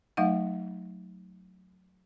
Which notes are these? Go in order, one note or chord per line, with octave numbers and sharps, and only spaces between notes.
F#3 A3 D#4 F5 F#5